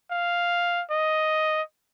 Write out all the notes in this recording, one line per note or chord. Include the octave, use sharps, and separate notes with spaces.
F5
D#5